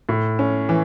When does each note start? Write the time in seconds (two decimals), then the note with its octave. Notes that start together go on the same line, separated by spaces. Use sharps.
0.09 A2
0.39 C#4
0.69 E3